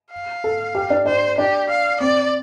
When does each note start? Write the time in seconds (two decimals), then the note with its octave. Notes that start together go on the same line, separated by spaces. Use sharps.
0.12 F5
0.44 A4
0.75 G4
0.90 D4
1.06 D4 C5
1.38 D4 G4
1.69 F5
2.00 C4 D5